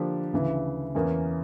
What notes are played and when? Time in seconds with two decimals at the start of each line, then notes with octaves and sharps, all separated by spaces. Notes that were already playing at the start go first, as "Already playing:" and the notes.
Already playing: D3 F3 A#3 D4 G4
0.33 D2 C#3 E3
0.95 E2 E3 A#3 C#4